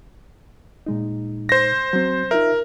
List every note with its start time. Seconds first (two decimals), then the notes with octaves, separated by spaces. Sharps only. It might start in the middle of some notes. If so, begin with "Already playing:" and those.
0.86 A#2 G#3 D#4
1.49 C5 A#6
1.93 F#3 C4
2.31 D#4 F4 A#4 E5